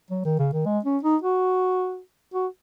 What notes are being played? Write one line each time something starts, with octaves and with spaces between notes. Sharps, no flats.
F#3
D#3
C#3
D#3
G#3
C#4
D#4
F#4
F#4